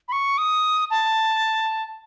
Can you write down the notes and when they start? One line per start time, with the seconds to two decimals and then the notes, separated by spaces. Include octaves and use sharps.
0.08 B5
0.12 C#6
0.38 D#6
0.91 A5